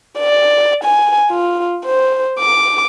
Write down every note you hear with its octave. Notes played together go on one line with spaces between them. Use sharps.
D5
G#5
F4
C5
D6